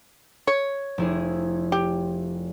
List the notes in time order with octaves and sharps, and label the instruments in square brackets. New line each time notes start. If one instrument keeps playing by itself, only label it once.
[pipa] C#5
[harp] F1 E4 G#4
[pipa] G4